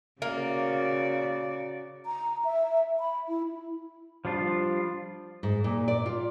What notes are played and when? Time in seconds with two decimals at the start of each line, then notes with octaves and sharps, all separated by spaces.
0.22 C#3 A#3 F#4 D5
2.06 A#5
2.44 E5
3.00 B5
3.29 E4
4.25 F3 G3 D4 F4
5.43 G#2
5.64 A#2
5.88 D5
6.06 F4